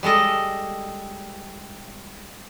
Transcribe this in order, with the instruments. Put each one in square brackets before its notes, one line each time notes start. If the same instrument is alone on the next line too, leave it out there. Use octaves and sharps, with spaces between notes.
[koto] G3 G#3 A4 D#5